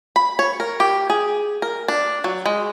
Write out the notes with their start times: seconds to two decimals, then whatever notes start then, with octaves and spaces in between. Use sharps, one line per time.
0.16 B5
0.39 C#5
0.60 A#4
0.80 G4
1.10 G#4
1.62 A#4
1.88 D4
2.24 F#3
2.46 G#3